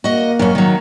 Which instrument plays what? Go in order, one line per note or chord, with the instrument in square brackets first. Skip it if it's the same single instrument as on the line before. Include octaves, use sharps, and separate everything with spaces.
[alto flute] A#3 [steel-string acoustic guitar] F#4 D#5
[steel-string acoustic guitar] F#2 C#4
D#3 F#3